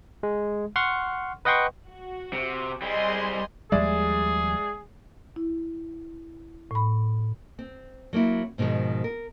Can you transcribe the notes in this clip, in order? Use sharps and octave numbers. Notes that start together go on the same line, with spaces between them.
G#3
F#5 C6 C#6 F6
B4 D#5 F#5 G5 C6 C#6
F#4
C3
G3 C4 G#4 D#5 C6
D#2 F3 G3 G#3 G#4 D5 E5
E4
A2 B5
C4
F#3 A#3 C4 E4
G#2 B2 D#3 F3 G#3
A#4